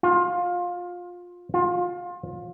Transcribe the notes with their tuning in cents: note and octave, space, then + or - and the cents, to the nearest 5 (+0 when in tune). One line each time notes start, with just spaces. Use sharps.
F4 +20
F4 +25